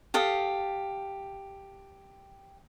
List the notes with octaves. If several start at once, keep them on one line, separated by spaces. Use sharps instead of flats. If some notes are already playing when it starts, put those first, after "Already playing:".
G4 A4 F5 D#6